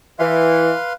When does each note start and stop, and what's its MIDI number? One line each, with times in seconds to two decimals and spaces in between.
0.19 0.72 52
0.19 0.93 71
0.19 0.93 77
0.19 0.93 84